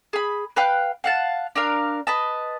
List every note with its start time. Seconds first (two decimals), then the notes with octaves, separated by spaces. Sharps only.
0.13 G#4 B5
0.56 B4 F5 G5 F#6
1.04 F5 F#5 A5
1.56 D4 A#4 F5
2.07 B4 D#5 A5